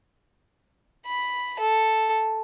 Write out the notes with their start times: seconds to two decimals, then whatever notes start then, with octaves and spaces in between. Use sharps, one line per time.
1.07 B5
1.60 A4